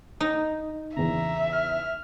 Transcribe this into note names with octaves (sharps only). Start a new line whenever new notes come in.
D#4
E2 C#3 E5 A#5
F6